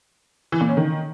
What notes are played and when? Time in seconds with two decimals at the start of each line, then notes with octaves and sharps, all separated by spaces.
0.52 E3
0.61 A#2
0.69 C#4
0.77 D#3